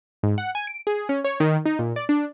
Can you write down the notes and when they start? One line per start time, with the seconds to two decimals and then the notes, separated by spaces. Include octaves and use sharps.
0.23 G#2
0.38 F#5
0.55 G#5
0.67 D7
0.87 G#4
1.09 C#4
1.24 C#5
1.40 D#3
1.65 D#4
1.79 A#2
1.96 D5
2.09 D4